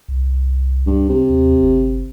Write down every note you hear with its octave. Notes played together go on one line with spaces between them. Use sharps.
C2
C#2 G2
C3
D#2
G1